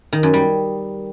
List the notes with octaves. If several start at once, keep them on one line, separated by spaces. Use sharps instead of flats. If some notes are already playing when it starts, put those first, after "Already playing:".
D#3
F#2
G3